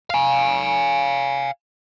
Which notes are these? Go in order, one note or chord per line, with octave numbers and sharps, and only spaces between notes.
F5 G#5